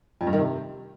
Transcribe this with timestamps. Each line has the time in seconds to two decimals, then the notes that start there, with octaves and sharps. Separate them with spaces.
0.21 F2
0.27 G2
0.33 D#3
0.39 C3